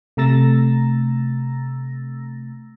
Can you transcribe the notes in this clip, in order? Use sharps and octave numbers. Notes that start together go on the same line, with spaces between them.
C3 A3 A#5 E6 A6 A#6